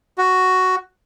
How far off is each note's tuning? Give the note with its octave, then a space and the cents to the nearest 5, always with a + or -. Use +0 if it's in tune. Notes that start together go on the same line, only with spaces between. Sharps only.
F#4 +5